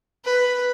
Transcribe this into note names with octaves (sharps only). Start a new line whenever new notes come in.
B4